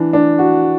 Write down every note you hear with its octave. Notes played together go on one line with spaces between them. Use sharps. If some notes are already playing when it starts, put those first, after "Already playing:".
Already playing: E3 D4
D4
F#4